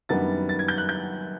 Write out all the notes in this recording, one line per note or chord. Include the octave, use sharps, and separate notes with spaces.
F#2 D#3 G3 B3 D4 A6
A6
G#6
G6
F#6
G6